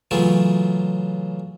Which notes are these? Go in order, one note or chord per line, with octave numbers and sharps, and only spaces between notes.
C#3 E3 F#3 A3 F4